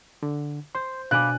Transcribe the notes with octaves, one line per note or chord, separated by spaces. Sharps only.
D3
C5 C6
B2 D4 F5 G#5 B5 D6 F#6